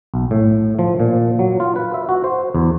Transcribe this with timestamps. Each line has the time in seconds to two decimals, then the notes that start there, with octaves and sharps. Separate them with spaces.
0.14 B1
0.31 A2
0.79 F3
1.00 A#2
1.39 F#3
1.60 F4
1.76 B4
1.94 E5
2.09 F#4
2.24 C5
2.55 E2